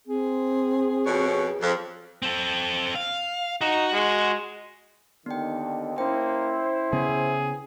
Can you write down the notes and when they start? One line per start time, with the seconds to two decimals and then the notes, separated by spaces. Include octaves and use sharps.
0.07 C4 G#4
1.06 F2 B2 C#5
1.61 F2
2.22 C4 A4
2.95 F5
3.61 D#4 F#4
3.93 G#3
5.26 D#2 D3 D#3 B3 G5
5.98 A#3 C#4 E4 C5 G5
6.93 C#3 B3 G#4